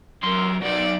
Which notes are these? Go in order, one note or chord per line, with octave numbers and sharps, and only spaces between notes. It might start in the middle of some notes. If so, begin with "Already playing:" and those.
F#2 A#4 C6
F#3 D#4 D5